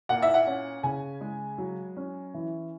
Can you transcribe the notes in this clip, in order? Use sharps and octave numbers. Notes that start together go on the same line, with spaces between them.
A#2 F#5
E5
F#5
C#4
C#3 G#5
G#3
F#3
C#4
E3